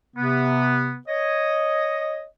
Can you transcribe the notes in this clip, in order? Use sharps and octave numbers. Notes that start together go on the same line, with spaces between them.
C3 B3
C#5 D#5